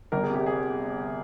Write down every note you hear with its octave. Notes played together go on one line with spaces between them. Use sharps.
G1 A#4
G#4
C3 G4
G#4